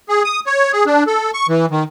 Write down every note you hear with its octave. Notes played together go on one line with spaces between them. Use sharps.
G#4
D#6
C#5
G#4
D4
A4
C#6
E3
D#3